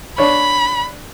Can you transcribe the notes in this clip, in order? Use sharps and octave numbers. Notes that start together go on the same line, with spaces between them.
D4 C#5 B5